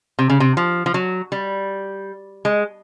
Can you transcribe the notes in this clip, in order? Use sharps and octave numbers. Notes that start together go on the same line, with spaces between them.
C3
C#3
C3
F3
F3
F#3
G3
G#3